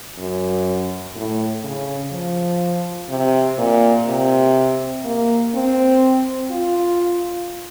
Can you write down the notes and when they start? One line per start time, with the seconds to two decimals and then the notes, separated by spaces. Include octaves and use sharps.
0.18 F#2
1.16 A2
1.64 C#3
2.12 F3
3.09 C3
3.58 A#2
4.08 C3
5.05 A#3
5.54 C4
6.51 F4